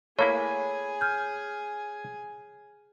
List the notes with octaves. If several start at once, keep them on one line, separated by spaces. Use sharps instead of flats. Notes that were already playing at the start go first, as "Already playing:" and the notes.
A3 A#3 E4 G#4 C#5 G#5 B5
F6 G6